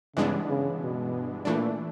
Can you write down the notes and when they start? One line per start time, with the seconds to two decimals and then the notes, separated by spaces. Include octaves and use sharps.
0.16 G2 C#3 E3 G#3 B3 D4
0.48 C#3
0.81 B2
1.45 A#2 E3 A3 D4